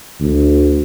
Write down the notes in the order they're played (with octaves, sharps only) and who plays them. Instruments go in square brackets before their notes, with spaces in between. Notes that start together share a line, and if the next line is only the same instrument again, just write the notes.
[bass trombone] D2